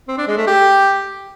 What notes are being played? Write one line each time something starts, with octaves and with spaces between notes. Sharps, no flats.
C4
D4
G#3
A3
G4